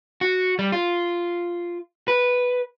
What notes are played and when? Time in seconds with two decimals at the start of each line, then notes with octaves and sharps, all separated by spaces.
0.21 F#4
0.59 G3
0.72 F4
2.08 B4